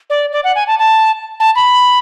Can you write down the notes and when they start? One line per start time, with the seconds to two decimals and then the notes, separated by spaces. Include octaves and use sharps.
0.10 D5
0.32 D5
0.44 F#5
0.56 G#5
0.67 A5
0.79 A5
1.40 A5
1.56 B5